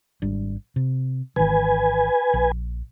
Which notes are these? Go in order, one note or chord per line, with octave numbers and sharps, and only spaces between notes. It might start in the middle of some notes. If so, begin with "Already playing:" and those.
G#1 G3 D4
C3
G#1 D#3 E3 B4 G#5
A#1